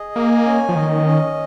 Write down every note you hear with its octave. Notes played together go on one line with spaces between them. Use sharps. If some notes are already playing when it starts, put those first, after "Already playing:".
Already playing: G#4 D#5
A#3 G#5
C#4
F3
D#3 D#5
C#4